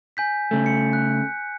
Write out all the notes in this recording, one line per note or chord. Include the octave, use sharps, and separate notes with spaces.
G#5 G6 B6
C#3 A3
C#7
F#6